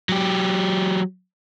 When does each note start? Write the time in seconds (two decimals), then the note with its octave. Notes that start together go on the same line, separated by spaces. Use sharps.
0.09 F#3 G4